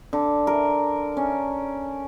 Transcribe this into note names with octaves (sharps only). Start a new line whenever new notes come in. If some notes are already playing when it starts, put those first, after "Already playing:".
D3
A#4
C#4